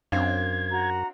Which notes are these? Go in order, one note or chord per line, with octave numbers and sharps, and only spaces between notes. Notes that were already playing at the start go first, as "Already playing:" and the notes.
F#2 C4 D4 F5 G#6
F#4 A#5